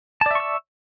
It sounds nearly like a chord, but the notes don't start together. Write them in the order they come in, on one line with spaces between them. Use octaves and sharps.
A5 D5 E5 C#6 E6